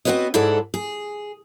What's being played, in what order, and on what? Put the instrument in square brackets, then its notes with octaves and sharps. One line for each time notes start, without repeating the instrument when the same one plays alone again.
[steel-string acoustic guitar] B3 C4 F#4 B4 C#5 D#5
G#2 E4 G#4 A4 D5 F#5
G#4